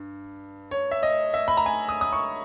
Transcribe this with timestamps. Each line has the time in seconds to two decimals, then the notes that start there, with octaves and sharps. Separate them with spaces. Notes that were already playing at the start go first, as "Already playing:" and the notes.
Already playing: G2
0.71 C#5
0.91 E5
1.03 D#5
1.34 E5
1.48 B5
1.57 A#5
1.66 G#5
1.89 D#6
2.01 D#6
2.13 C#6